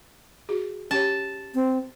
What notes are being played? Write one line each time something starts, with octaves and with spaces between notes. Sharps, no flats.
F#4 G#4
C#4 G4 C#5 A5
C4